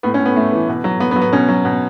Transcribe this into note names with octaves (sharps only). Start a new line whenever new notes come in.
A2 B3
C#4
A2
B3
A2 A3
E3
B2
F#3
F#3 B3
B3
F#3
B3
B2 C#4
F#3
B2